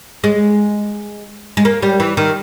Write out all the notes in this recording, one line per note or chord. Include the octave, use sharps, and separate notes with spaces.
G#3
G#3
A#3
G3
E3
D#3